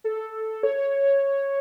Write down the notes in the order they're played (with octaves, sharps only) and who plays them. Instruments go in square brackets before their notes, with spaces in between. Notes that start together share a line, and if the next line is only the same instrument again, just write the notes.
[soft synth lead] A4
C#5